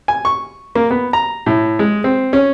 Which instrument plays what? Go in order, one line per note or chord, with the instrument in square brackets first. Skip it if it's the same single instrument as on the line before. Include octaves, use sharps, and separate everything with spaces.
[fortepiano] G#5
C#6
A#3
B3
A#5
A2
G#3
C4
C#4